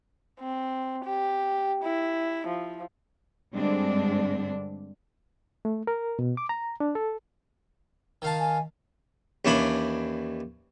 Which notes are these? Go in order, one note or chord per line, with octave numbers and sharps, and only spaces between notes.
C4
G4
E4
F3
G2 D3 G#3 C4 D4
A3
A#4
B2
D6
A#5
D4
A4
D#3 F5 A5
G#5
D#2 E3 C#4 D4 B5